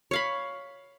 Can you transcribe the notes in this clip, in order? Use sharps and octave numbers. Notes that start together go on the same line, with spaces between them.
C#5 F5 B5